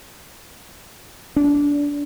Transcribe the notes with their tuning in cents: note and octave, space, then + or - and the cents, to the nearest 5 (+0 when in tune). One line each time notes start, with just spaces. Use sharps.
D4 -20